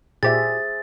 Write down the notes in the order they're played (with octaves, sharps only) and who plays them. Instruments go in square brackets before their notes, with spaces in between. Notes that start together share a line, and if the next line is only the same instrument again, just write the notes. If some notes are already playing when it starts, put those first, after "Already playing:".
[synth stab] A#2 G4 [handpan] G#4 C5 E5 [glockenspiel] A6